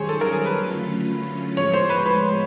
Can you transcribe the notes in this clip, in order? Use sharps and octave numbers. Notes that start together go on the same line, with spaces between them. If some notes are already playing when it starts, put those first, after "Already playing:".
Already playing: F#2 D#3 G3 G#4 C5 C#5
A4
A#4
G#4
B4
D3 F#3 A3 C#4 F4
A2 F3 G#3 B3 C#5
C5
B4
B4